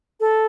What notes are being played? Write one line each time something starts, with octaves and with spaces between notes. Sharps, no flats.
A4